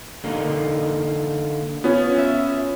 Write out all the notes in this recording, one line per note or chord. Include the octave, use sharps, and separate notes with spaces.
D3 A#3 D#4
B3 C#4 F4 C#5
E5